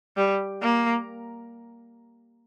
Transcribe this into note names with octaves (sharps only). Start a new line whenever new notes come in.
G3
A#3